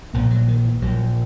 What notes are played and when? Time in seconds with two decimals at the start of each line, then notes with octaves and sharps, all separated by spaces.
0.13 A#1 A#2 A#3
0.31 F#3
0.48 D#3
0.64 E3
0.82 A#1 A#2 F#3